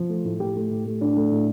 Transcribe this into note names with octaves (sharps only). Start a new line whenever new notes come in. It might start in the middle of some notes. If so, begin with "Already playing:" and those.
Already playing: F3
A3
A2
A2 G4
A3
A2
A3
A2 D4
A3
A2